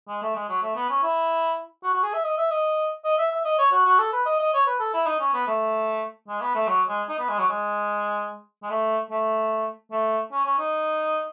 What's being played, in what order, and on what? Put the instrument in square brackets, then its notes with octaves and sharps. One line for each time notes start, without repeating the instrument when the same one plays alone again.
[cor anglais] G#3
A3
G#3
F#3
A3
B3
C#4
E4
F#4
F#4
G#4
E5
D#5
E5
D#5
D#5
E5
E5
D#5
C#5
F#4
F#4
A4
B4
D#5
D#5
C#5
B4
A4
E4
D#4
C#4
B3
A3
G#3
B3
A3
F#3
G#3
D#4
B3
G#3
F#3
G#3
G#3
A3
A3
A3
C#4
C#4
D#4